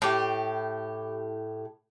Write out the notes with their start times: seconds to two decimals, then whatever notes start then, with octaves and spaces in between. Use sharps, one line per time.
0.02 A2 G4